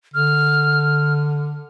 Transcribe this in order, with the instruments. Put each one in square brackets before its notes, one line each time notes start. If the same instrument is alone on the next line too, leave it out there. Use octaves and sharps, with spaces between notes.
[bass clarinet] D3 [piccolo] F6